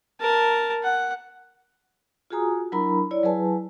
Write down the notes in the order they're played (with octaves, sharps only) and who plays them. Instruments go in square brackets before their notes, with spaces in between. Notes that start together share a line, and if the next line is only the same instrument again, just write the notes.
[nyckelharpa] A#4 A5
F#5
[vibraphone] F4 F#4 G#4 G#5 A#5 D#6
F#3 D4 E4 A#4 A#5 B5
E4 C#5 D5
F#3 E4 G#4 B4 G#5 A5